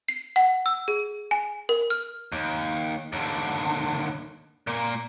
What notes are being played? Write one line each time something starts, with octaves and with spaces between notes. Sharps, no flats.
C7
F#5
E6
G#4
G#5
A#4
F6
D#2
D#2 D3
A#2 A#3